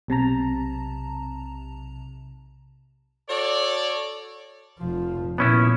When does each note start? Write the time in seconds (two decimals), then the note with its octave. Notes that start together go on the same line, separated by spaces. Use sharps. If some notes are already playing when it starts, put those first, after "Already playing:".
0.08 B1 C3 A5 A#5
3.29 F#4 A4 C#5 D5
4.79 F1 F3
5.38 A#2 B3 C#4 E4